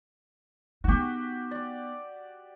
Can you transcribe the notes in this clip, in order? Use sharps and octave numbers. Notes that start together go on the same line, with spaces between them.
B3 D#4 F#4 G4
D5